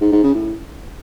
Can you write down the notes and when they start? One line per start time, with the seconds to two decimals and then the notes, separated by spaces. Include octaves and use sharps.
0.01 G#2
0.12 G#2
0.23 C#3
0.34 A2